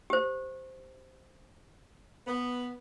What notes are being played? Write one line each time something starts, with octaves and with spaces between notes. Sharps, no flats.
G4 C5
B3